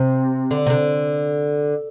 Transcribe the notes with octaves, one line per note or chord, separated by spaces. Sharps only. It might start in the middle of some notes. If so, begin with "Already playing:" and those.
Already playing: C3
D3
C3
D3